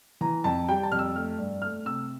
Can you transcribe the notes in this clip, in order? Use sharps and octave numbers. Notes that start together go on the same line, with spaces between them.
E3 A#5
F2 A5
G3 G5
A5
F2 F6
E6
A3 F6
G2
A3 F6
C3 E6